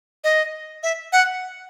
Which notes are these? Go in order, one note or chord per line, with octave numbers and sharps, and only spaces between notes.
D#5
E5
F#5